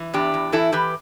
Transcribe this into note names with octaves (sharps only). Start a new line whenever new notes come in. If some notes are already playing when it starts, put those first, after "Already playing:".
Already playing: E3
E2 D4 G4
E2
E3 E4 A4
E3 G4 B4